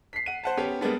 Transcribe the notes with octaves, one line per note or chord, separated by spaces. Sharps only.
B6 C7
F#5 D#7
C5 F#5 A5
B3 C#4 G4
G3 G#3 A#3 B3 D4